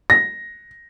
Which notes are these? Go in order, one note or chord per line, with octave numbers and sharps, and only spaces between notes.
A#6